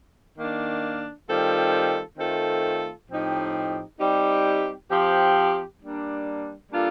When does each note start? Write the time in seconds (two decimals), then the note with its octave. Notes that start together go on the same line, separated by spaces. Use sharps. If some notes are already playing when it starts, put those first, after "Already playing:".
0.37 D#3 A#3 D4
1.28 D#3 G3 C4 F4 A4
2.18 D#3 A3 C4 F4 A4
3.09 A2 F3 C4 D#4 G4
3.99 G3 C4 D#4 G4
4.90 F3 C4 G4
5.80 G3 A#3 D4
6.71 G3 A#3 D4 F4 A4